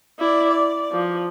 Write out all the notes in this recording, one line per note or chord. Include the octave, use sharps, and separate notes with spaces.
E4 D5
D5
F3